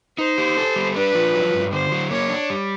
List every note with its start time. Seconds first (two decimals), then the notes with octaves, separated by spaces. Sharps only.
0.18 D#4 C5
0.38 G4
0.57 A4
0.76 G3
0.95 D4 B4
1.15 F3
1.35 F#3
1.53 G2
1.73 D3 C5
1.92 F#3
2.10 A#3 C#5
2.30 D4
2.50 G3